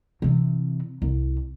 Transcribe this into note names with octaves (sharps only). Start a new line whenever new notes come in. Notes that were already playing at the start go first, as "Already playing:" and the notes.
C3 E3
C2